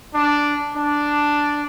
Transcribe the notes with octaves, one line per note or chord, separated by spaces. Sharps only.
D4
D4